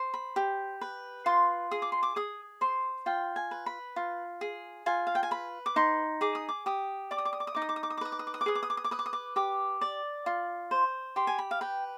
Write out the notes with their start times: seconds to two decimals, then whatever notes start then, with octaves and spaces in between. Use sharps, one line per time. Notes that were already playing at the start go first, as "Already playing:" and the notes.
Already playing: C5
0.14 B5
0.36 G4
0.81 B4
1.26 F4 C6
1.71 G#4 D#6
1.82 D6
1.92 C6
2.03 D6
2.16 G#4 D#6
2.61 C5 C6
3.06 F4 G5
3.36 G#5
3.51 B4
3.66 B5
3.96 F4
4.41 G#4
4.86 F4 G#5
5.07 F5
5.15 G5
5.23 G#5
5.31 B4 B5
5.66 D6
5.76 D#4 C6
6.21 G#4 D6
6.35 D#6
6.49 D6
6.66 G4 D#6
7.11 D5 D6
7.18 D#6
7.25 D6
7.33 D#6
7.40 D6
7.47 D#6
7.55 D#4 D6
7.62 D#6
7.69 D6
7.76 D#6
7.83 D6
7.90 D#6
7.97 D6
8.01 B4 D#6
8.12 D6
8.19 D#6
8.27 D6
8.34 D#6
8.41 D6
8.46 G#4 D#6
8.55 D6
8.63 D#6
8.70 D6
8.77 D#6
8.84 D6
8.91 B4 D#6
8.99 D6
9.06 D#6
9.13 D6
9.36 G4 D6
9.81 D5
10.26 F4
10.71 C5
11.16 G4 C6
11.27 G#5
11.38 B5
11.51 F5
11.61 B4 G5